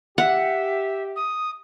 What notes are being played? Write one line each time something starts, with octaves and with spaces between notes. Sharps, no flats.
G4 E5 F#5
D#6